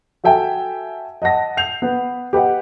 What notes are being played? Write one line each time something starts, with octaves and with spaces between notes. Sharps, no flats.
F#4 A4 E5 G5 G#5
D#5 F#5 A5 A#6
G6 C7 F7
B3 B4
G4 B4 D#5 F#5